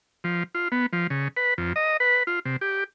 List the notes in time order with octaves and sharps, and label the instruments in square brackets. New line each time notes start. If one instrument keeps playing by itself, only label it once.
[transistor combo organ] F3
F4
B3
F3
C#3
B4
F2
D#5
B4
F4
C3
G4